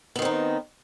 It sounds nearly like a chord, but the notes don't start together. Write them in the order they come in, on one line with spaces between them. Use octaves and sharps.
B3 D#3 C4 D#4